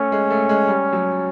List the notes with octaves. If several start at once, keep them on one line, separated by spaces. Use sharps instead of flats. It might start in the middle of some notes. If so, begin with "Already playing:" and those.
Already playing: A3 C#4
G#3
A3
G#3
G3
F#3